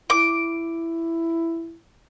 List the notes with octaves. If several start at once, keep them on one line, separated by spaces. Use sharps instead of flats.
E4 D6